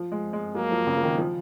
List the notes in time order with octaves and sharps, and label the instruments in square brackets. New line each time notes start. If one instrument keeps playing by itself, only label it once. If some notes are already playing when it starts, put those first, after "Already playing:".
Already playing: [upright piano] F3
G#3
G#3
[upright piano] F#3 [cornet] A#3
[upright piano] F3
C#3
F3
D#3
F3